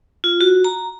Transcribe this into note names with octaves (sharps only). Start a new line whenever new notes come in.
F4
F#4
A#5